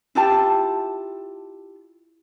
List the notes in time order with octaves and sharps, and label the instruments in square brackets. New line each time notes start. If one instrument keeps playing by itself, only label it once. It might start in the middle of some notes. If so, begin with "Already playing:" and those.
[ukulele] E4 F4 G4 A5